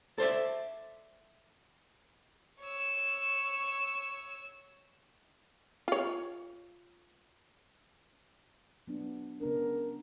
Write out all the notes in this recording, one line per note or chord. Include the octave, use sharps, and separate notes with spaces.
A4 C5 D5 E5
C#5 E6
F4 C#5
F#3 B3 D4
C#3 B3 D4 A#4